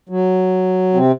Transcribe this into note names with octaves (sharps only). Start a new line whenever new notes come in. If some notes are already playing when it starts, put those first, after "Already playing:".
F#3
C3 C4